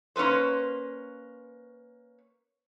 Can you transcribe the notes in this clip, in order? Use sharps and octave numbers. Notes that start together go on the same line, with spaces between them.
A#3 C#4 F4 B4 C5